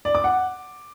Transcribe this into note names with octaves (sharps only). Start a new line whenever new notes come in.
D5
D6
F#5